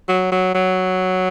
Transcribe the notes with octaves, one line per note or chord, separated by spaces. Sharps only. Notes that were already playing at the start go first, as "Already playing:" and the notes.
F#3
F#3
F#3